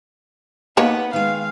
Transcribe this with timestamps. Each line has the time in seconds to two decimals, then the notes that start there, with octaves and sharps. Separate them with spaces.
0.77 A#3 B3 D#4 B4 C#5
1.13 D#3 G#3 F5